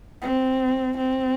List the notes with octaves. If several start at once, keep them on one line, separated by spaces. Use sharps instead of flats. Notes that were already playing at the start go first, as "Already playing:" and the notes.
C4
C4